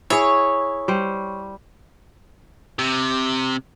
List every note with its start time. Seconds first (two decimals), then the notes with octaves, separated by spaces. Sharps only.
0.10 E4 G#4 C#5
0.88 G3 C5
2.79 C3